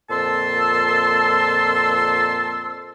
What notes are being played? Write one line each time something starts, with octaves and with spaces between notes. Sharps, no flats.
F2 A#2 A5 C6 E6